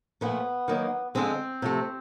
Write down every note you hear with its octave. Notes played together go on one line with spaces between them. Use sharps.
A#2 F3 A3 B3
D#3 F#3 A#3
D3 F3 G#3 C4
C3 F3 A3